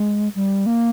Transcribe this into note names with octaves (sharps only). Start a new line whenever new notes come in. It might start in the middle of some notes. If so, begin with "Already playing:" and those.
Already playing: G#3
G3
A#3